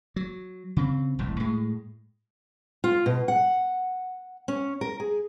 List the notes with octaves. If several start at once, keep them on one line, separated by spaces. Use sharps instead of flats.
F#3
C#3 C4
E1 C2 A2
A2 G#3
F4
B2
F#5
C#4
A#4
G#4